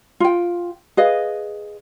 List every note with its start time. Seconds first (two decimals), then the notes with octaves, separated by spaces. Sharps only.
0.20 F4 G5
0.97 G#4 B4 D#5 F5